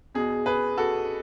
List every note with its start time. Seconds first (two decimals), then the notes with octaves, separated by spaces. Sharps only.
0.15 E2 B2 G#4
0.46 G#4 B4
0.77 F#4 A4